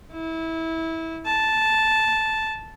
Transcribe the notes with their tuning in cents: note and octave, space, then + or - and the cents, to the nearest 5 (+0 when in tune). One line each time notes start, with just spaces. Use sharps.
E4 -20
A5 -5